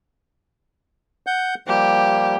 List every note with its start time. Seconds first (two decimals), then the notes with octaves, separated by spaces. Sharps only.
1.27 F#5 G6
1.67 F3 G3 A#3 G4